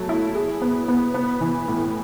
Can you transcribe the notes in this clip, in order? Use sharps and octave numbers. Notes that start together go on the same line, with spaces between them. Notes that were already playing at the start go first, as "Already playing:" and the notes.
Already playing: F#3 A3
E4
G#4
B3
B3
B3
E3
A2